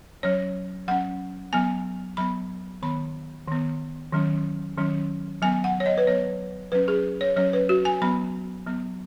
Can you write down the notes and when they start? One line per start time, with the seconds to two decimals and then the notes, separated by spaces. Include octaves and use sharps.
0.23 F#3 C#4 C#5
0.88 F#3 C#4 F#5
1.53 F#3 B3 G#5
2.17 F#3 B3 B5
2.82 D#3 B3 B5
3.48 D#3 B3
4.13 D#3 F#3 C#4
4.77 D#3 F#3 C#4
5.42 F#3 B3 G#5
5.64 F#5
5.80 C#5
5.86 D#5
5.98 B4
6.07 F#3 B3 C#5
6.72 F#3 C#4 B4
6.88 G#4
7.21 C#5
7.36 F#3 C#4 C#5
7.53 B4
7.69 F#4
7.85 G#5
8.02 F#3 B3 B5
8.67 F#3 B3